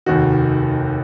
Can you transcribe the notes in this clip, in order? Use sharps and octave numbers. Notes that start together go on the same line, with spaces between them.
F1 D#2 D#3 F#4